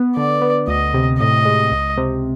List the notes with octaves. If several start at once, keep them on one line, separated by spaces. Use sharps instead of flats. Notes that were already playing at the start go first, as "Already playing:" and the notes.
Already playing: B3
D3 D5
B3
D2 D#5
C3
A2 D#5
G#3
C#2
C3